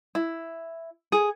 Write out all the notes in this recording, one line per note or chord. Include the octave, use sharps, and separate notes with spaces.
E4
G#4